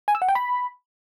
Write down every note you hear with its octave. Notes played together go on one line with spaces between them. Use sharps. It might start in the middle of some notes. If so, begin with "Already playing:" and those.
G#5
E6
F#5
G5
B5